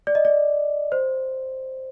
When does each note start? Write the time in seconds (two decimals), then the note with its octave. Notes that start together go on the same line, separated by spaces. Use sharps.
0.07 D5
0.15 D#5
0.25 D5
0.92 C5